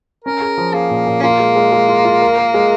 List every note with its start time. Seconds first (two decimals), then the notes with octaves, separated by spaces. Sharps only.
0.25 C#4 A#4
0.41 G#4
0.58 F3
0.74 A#3 G#4
0.90 A#2
1.07 A#2
1.20 C#4
1.23 A#3 F4
1.39 G#3
1.56 G#3
1.72 G#3
1.89 F4
2.05 F4
2.22 A#4
2.38 A#4
2.54 G#3